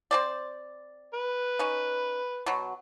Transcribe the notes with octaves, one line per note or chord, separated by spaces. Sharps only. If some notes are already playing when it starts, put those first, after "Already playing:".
C4 C5 D5
B4
C#4 D#4
B2 F#3